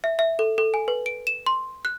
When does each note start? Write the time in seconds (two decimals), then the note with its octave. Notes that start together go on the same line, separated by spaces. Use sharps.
0.04 E5
0.19 E5
0.39 A4
0.58 A4
0.74 G#5
0.88 B4
1.06 D7
1.27 E7
1.46 C6
1.85 F#6